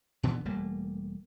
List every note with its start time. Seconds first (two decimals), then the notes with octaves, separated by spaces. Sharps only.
0.23 A#2 D3 E3 B3
0.45 E1 G3 A3 A#3